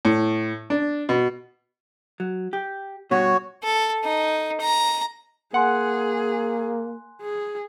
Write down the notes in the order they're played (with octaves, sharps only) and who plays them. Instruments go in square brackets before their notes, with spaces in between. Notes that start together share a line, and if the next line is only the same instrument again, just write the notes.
[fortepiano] A2
D4
B2
[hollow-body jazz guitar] F#3
G4
[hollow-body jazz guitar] G2 B2 [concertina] F#4 C#5
[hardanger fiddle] A4
D#4
A#5
[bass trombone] A#3 [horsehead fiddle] G#4 [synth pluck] F#5 [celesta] G#5 C6 F#6
[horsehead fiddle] G#4